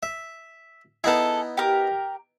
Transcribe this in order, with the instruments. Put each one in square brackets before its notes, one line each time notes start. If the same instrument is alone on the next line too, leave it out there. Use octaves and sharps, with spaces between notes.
[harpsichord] E5
[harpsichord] B3 D#4 E4 [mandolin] G#4 A4
[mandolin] G4 A#4